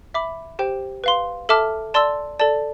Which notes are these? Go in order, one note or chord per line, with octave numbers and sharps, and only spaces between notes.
E5 B5 D6
G4 C5 G5
B4 F5 C6
A4 E5 A5 D6 F6
D5 A5 C6 E6
A4 D5 A5